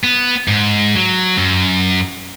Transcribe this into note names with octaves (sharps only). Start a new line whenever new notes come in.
B3
G#2
F#3
F#2